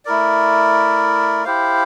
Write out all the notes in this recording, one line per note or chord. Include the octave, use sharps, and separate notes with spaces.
A3 E4 A#4 D5
E4 G4 C5 F5